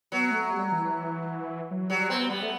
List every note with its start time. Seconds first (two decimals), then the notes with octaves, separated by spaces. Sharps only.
0.12 F#3 B3
0.31 A3
0.51 G3
0.72 E3
1.71 F#3
1.90 F#3 G3
2.10 B3 C4
2.30 G3 B3
2.43 A3